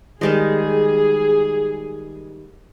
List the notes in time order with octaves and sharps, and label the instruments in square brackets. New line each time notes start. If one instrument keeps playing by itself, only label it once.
[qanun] D#3 G3 G#3 [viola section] G#4